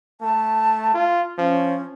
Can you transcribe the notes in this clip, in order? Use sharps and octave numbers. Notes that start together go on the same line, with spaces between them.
A3 A5
F4
F3 C#4